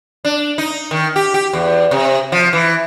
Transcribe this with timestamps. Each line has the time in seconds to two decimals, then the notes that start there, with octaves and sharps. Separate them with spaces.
0.25 D4
0.58 D#4
0.91 D#3
1.16 G4
1.34 G4
1.53 E2
1.91 C3
2.32 F3
2.53 E3